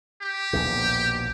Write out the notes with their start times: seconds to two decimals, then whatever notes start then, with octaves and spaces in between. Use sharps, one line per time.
0.22 G4
0.53 A#1 D#2 B2